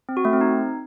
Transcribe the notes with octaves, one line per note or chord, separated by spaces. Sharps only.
C4
F#4
A3
C4
D#4